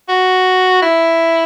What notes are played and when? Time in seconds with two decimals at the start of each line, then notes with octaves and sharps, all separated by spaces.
0.09 F#4
0.82 E4